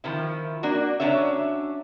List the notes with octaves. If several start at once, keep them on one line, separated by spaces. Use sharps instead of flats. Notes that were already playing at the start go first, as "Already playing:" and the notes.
D#3 F3 E4
A#3 D4 F#4
F#3 A3 C#4 D4 C#5 E5